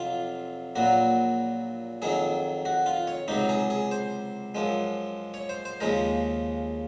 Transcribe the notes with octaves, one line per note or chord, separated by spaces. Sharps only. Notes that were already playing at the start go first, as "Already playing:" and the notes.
Already playing: F2 C3 F#3 F4
A#1 A#2 F#3 F#4
F2 D#3 F#3 G#4
F#4
F4
C#5
C#2 C3 F#3 D#4
G#4
G#4
C5
F#2 F3 G#3
C#5
C5
C5
D#2 C#3 F3 G#3 A#4